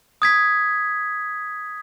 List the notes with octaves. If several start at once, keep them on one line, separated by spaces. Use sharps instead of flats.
D#6 G#6 B6